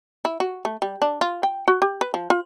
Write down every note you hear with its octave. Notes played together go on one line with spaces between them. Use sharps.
E4
F#4
A3
G3
D4
F4
G5
F#4
G4
B4
F3
F4